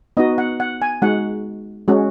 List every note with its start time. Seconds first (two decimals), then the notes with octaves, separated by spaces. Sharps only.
0.17 B3 D#4 F#4 D#5
0.38 F#5
0.60 F#5
0.82 G#5
1.02 G#3 D#4 F#4 F#5
1.88 G#3 C#4 F#4